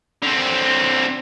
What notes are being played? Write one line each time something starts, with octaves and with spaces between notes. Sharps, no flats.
D3 C4